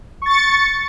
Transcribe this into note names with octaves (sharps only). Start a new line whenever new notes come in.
C#6 A6 C#7